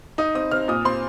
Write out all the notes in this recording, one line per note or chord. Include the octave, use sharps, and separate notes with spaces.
D#4 D#6
C4 D#6
C4 F6
A#2 D#6
C4 C6